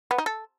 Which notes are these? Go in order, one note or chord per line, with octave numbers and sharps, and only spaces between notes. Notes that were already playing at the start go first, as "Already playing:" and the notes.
B3
D#4
A4